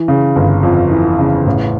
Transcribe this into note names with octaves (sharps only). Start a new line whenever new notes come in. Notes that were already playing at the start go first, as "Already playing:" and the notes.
Already playing: E3
C#3
G1
F2
E3
C#3
A1